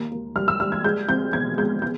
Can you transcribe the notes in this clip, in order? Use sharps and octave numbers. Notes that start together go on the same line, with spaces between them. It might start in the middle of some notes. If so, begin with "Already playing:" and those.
Already playing: D#2 A#3
A#3
G3 F6
E6
G3 F6
G#6
G#3 G6
C4 G6
B2 G#6
G#3 G6
B3 G6